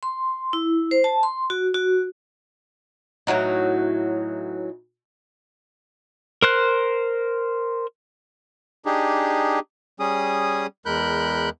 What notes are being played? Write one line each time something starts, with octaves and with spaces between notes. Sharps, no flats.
C6
E4
C5
A5
C6
F#4
F#4
A2 E3 F#3 D#4
A#4 C5 F#6
D4 D#4 G4 G#4
G3 C#4 G#4 D#6
E2 G#3 A#4 B5 F#6 G6